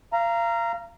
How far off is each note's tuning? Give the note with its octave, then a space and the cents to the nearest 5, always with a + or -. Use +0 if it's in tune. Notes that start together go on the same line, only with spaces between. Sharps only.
F5 -30 A#5 +0